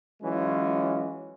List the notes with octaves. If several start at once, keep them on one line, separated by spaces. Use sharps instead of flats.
E3 F#3 G#3 C#4 F4